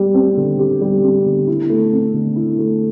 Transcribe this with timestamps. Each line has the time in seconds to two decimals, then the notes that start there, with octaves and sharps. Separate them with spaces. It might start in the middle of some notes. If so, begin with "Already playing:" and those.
Already playing: G3 G4
0.14 C4
0.37 D3
0.59 G4
0.81 G3
1.04 C4
1.26 D3
1.47 E4
1.70 A3
1.93 C4
2.14 D3
2.36 E4
2.59 A3